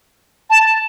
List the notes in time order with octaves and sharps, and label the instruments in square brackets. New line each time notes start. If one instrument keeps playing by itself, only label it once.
[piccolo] A5